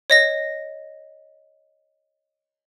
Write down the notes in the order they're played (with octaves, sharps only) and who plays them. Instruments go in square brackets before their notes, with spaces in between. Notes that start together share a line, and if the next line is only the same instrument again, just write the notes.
[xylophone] C#5 D#5 A#6